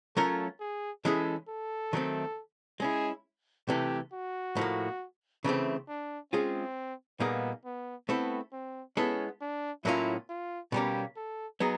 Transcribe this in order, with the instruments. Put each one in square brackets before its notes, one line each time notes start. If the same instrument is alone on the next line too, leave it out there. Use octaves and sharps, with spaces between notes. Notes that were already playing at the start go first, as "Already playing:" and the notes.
[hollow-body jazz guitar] F#3 A3 C#4 F4 A#4 [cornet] A4
[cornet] G#4
[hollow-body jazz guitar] E3 G#3 C#4 E4 G#4 [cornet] A4
[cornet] A4
[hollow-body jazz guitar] D#3 F#3 A3 C4
[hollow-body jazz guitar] G#3 C#4 E4 [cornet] G#4
[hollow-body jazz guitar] C3 E3 A3 [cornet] G4
[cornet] F#4
[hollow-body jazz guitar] A2 F3 A#3
[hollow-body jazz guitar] C#3 E3 A3 C4 [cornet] E4
[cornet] D4
[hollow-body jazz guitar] G#3 C#4 F4 G#4 [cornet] C4
[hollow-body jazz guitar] A#2 G3 A#3 D#4 G#4 [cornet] B3
[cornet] B3
[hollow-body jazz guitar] A3 C4 E4 A4 [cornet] B3
[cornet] C4
[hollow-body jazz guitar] G#3 B3 E4 A4 [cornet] C#4
[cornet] D4
[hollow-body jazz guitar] A2 F#3 A#3 C#4 F4 [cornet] E4
[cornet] F4
[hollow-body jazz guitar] B2 G3 A#3 C#4 [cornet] G4
[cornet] A4
[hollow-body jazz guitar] F#3 B3 D#4 G#4